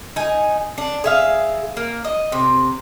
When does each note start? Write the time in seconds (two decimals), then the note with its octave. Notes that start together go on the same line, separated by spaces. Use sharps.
0.16 D#4 G#5
0.78 D4
1.04 G#4 E5 F5
1.77 A#3
2.04 D#5
2.32 C3